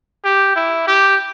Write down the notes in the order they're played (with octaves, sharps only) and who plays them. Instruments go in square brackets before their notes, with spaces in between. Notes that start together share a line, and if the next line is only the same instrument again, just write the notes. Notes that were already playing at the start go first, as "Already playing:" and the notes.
[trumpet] G4
E4
G4